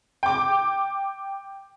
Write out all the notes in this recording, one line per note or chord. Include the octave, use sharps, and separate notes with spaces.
G5 D6